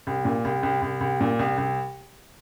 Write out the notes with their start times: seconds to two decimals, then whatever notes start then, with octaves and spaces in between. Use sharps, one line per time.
0.07 C2
0.25 A#2
0.45 C2
0.63 C2
0.82 C2
1.01 C2
1.21 A#2
1.39 C2
1.58 C2